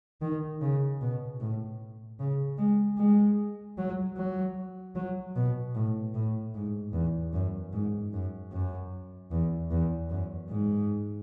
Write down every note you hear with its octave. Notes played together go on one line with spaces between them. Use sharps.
D#3
C#3
B2
A2
C#3
G#3
G#3
F#3
F#3
F#3
B2
A2
A2
G#2
E2
F#2
G#2
F#2
F#2
E2
E2
F#2
G#2